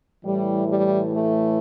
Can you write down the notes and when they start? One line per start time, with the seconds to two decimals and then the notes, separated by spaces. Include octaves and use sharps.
0.24 A2 E3 G3
0.69 G3
1.13 A3